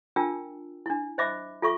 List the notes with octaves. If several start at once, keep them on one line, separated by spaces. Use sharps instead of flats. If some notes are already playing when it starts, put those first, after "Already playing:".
D4 F4 A#4 G5 A5 E6
D4 E4
C5 D#5 E5 B5 D6
F4 A4 E5 C#6 D6